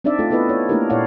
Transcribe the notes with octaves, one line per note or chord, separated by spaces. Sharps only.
C4 D4 D#4 D5 E5
A3 F4 A4
B3 E4 A4 B4 D#5
C#5
A3 A#3 D4 E4 G4 A#4
A#2 E4 C#5 D5 F5 F#5